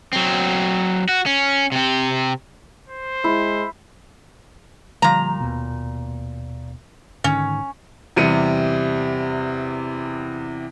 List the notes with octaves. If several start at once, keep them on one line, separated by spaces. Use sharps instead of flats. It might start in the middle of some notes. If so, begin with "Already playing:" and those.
F#3 C4
F#4
C#4
C3 C4
C5
G#3 E4
A#2 D3 F3 G3 A#5
D#2 B2
G#2 D3 D#3 C#4
E2 C3 G3 C#7 D#7